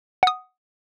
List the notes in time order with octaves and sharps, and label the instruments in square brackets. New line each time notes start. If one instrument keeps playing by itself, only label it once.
[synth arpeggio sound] F#5 D#6